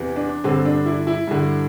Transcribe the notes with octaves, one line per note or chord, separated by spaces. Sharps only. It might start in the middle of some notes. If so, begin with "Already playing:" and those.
Already playing: E2 C3 E3
D4
G2 D3 C4
D4
E4
E4
G2 D3